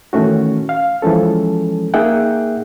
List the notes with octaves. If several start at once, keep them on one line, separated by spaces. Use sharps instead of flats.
D#3 E3 A3 C#4 F#4
F5
E3 F3 G#3 C#4 A4
A#3 D#4 G#4 E5 F#5 G5